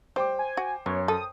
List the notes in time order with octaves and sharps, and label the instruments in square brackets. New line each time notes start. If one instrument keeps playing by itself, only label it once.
[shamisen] G3 [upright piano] C5 G5 D6
[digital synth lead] G#5
[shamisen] F#4
[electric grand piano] F#2 [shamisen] B3 [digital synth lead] C#5
[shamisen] A4 [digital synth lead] D#6